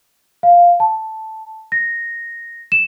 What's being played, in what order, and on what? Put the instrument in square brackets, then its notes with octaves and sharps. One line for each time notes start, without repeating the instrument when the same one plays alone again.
[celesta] F5
A5
A#6
E7